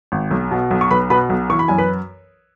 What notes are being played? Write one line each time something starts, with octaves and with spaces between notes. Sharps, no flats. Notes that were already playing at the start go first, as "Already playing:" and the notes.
G#1
B1
B2
B1
C#6
B1 B4 B5
B2 B4 B5
B1
E3 C#6
B5
F#2 G#5
B4 B5